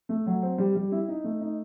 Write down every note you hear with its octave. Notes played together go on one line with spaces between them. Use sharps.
A3
F#3
C4
G3
G3
E4
D#4
A3
D#4